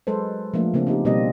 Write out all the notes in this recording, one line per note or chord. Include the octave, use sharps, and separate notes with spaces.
F#3 G#3 A4 B4 C5
F3 A3 A#3 D4
C#3 A#3 C4 D4
C4 D#4 G4
B2 G3 A#3 C4 D#5